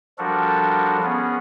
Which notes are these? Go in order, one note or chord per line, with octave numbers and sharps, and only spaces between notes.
F3 G3 D4 F#4 A4 A#4
B3 C#4 G#4